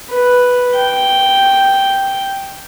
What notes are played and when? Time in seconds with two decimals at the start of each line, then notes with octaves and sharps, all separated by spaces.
0.10 B4
0.75 G5